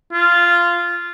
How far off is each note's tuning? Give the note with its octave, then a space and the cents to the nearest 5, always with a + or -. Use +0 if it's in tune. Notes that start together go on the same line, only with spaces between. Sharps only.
F4 -10